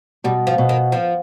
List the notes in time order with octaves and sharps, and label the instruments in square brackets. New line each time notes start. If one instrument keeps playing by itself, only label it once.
[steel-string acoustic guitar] B2 [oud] G3
[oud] F3
[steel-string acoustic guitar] B2
[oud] D#3
F3